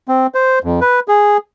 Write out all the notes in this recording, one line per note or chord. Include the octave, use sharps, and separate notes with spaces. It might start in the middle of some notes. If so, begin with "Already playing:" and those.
C4
C5
F2
B4
G#4